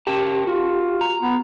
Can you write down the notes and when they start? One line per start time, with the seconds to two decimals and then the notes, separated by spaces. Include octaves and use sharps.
0.07 C#4 G4 A#4 A5
0.47 F4 F#4
1.01 A#5
1.22 B3